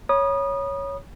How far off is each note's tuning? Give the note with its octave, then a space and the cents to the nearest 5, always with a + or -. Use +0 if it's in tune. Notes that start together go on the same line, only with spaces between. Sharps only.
C#5 +0 B5 -40 D#6 -25